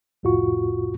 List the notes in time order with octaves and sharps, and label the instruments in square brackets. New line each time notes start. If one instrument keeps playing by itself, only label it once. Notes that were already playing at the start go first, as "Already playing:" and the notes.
[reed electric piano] C2 F2 A2 F4 F#4 C#6